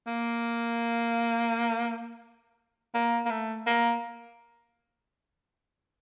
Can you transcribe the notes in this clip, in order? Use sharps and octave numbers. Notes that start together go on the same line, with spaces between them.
A#3
A#3
A#3
A3
A#3